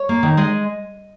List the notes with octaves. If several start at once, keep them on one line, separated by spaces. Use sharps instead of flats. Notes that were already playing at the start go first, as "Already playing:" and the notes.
Already playing: C#5
A#3
D#3
G#3 D#5